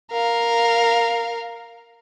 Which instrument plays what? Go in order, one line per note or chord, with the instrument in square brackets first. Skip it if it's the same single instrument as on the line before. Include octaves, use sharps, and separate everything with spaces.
[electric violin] A#4 F5